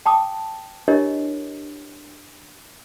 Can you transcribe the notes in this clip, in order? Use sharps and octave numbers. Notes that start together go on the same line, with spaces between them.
G5 A5 D6 D#6
D4 E4 G4 A#4 C#5 D#5